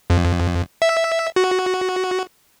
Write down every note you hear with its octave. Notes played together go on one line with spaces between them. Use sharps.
F2
E5
F#4